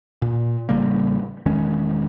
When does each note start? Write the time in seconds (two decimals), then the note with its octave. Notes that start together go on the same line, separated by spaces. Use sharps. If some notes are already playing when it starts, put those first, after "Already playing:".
0.22 A#2
0.69 A1 C#3 G3 A#3
1.46 E1 D#3 G#3 C#4